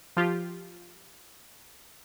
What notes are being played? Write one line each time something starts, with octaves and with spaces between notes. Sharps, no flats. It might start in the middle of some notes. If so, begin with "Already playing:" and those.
F3 F4 G4